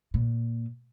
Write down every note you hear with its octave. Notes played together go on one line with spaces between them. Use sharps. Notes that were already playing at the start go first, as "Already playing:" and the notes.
A#2